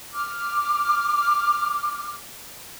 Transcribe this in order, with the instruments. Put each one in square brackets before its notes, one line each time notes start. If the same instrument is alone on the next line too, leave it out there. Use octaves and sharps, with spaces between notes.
[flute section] D6 F6